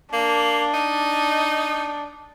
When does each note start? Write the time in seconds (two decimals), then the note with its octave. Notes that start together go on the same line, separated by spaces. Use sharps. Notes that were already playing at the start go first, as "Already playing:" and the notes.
0.13 A#3 D4
0.74 D#4